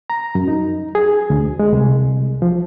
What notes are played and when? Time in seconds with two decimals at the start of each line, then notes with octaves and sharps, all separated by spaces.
0.10 A#5
0.35 F#2
0.48 D#4
0.95 G#4
1.30 D2
1.59 G#3
1.73 C2
2.42 F3